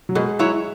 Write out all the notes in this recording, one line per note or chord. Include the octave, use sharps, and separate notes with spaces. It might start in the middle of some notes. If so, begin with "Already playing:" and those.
F#3
B2 G#3
F#3 E4 C#5